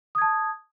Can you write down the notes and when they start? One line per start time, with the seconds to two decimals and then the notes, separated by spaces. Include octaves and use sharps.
0.15 D#6
0.18 G#6
0.22 A5